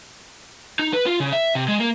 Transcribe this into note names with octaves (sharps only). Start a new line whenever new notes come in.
D#4
B4
F4
C#3
E5
C3
G#3
A#3